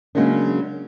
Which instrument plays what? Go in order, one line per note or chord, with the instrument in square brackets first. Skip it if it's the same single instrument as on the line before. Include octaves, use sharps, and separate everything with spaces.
[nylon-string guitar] C#3 F#3 G#3 A#3 C#4 D4